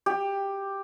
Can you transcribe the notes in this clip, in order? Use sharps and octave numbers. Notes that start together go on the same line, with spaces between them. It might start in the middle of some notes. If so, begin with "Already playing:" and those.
G4